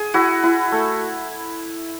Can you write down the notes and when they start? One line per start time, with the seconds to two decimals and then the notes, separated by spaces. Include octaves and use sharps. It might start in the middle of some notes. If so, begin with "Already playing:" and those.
Already playing: G#4
0.14 E4 F#4
0.43 E4
0.72 A3